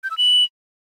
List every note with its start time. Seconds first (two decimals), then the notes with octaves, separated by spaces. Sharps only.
0.04 G6
0.11 E6
0.18 F#7